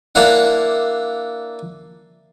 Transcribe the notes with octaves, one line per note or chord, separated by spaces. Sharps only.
A#3 D4 E4 F5 F#5